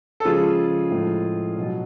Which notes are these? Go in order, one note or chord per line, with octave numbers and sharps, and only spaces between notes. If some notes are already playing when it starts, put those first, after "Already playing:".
A4
C#3 F3 G#3 F4 G#4
A2 F3 G#3
B2 F#3